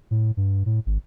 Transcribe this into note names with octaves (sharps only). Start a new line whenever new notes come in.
A2
G2
A2
G#1